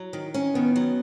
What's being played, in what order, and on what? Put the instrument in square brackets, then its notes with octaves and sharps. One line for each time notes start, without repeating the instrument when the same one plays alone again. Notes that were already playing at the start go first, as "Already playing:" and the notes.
Already playing: [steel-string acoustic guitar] F#3
D#3
C#4
[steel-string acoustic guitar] D#3 [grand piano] B3
[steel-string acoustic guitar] F#3